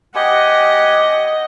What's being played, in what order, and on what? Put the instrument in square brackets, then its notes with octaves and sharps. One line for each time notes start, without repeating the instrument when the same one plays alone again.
[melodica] G4 G#5 [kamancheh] D#5 [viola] F#5